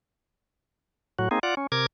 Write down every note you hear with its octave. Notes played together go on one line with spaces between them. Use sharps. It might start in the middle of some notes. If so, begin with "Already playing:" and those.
A2 F#3 F#4
A#3 C4 D#4 G#4
F4 D5 F#5
C#4
C3 A#4 D6 G#6